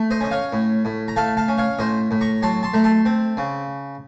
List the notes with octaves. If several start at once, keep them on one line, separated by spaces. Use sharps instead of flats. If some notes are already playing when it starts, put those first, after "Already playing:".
Already playing: A3
C5 D#5
C#4 D#5
C#5 F5
A2
A2
A#5
A3 F5 A5
F5 A5
C#4
C#5 F5
A2 C5 D#5
A2
A#5 C#6
F#3 A5 C6
A5 C6
A3 A#5
A5 C6
C4
C#3